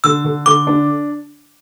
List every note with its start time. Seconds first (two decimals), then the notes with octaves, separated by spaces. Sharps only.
0.04 D3 E6
0.25 D3
0.46 D3 D6
0.67 D4